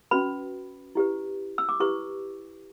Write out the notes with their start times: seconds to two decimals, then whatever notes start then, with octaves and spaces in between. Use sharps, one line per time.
0.11 C#4 F#4 B4 B5
0.95 E4 G4 B4
1.58 E6
1.69 D6
1.80 E4 G4 B4 C#6